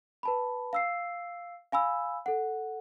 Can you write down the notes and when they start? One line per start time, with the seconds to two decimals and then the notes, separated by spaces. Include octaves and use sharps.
0.23 B4 A5 B5
0.73 F5 E6 C7
1.72 F5 G#5 B5 E6
2.26 A4 F#5